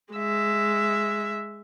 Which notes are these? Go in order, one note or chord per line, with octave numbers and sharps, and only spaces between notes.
G#3 E5